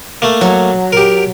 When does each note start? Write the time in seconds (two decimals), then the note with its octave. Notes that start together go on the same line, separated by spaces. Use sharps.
0.22 A3 A#3
0.41 F#3
0.93 G4 A#4